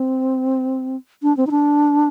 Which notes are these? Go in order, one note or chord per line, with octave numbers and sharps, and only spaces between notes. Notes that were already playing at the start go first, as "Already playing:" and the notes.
Already playing: C4
D4
C4
D#4
D4